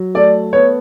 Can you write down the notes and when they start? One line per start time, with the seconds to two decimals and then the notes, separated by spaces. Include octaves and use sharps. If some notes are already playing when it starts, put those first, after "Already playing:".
Already playing: F#3
0.15 A3 D5
0.53 B3 C#5